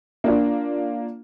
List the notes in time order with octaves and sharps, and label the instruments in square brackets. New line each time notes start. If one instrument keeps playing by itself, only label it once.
[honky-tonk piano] A#3 D4 F4